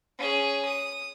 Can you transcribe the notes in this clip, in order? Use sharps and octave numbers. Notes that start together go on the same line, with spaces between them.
C#4 G#4
D#6